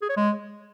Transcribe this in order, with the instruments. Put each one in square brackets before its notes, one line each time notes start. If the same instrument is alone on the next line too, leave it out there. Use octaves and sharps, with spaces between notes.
[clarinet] G#4
C#5
G#3